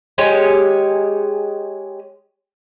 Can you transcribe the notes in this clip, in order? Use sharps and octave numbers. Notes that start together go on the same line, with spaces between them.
G#3 G4 G#4 C#5